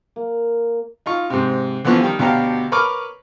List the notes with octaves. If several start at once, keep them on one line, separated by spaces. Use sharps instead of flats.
A#3
D#4 F4 C#6
G#2 C3
D3 E3 F3 B3 C#6 F#6
D#3 G3
D2 B2 D4 G4 F5 A#5
A#4 B4 C#5 C#6 D6 F6